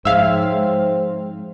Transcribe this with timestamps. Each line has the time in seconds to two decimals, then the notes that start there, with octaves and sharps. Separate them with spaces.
0.05 G#2 F3 C4 G#4 C#5 E5 F5